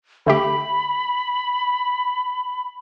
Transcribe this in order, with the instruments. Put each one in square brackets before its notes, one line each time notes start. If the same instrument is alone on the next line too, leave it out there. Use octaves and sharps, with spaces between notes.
[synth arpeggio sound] D3 A3 G4 [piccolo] B5